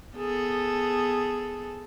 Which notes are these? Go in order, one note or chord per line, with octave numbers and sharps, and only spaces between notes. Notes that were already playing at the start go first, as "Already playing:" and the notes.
B3 G#4 A4